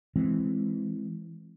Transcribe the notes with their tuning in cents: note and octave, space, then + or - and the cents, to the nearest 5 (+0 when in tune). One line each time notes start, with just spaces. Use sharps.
E3 +0 G#3 +5 C4 +5